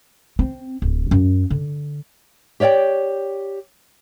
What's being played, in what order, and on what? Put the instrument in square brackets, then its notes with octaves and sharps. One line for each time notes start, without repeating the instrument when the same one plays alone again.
[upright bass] C4
D1
F#2
D3
[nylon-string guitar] G4 C#5 D5 E5 G5